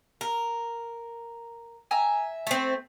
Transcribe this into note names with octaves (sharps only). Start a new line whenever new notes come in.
A#4
E5 G#5 A#5
A3 C4